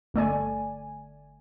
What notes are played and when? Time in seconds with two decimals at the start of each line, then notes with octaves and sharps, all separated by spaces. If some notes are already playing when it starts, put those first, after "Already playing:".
0.14 G1 A3 D5 G#5